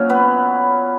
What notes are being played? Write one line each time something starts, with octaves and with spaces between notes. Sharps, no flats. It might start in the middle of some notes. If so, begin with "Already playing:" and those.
Already playing: A#2 F#3 C#4 C#5
B3 B4